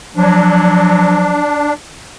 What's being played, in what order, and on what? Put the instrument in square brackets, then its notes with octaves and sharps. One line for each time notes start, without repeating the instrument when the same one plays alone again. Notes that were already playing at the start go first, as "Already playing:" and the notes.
[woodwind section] F3 F#3 [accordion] D4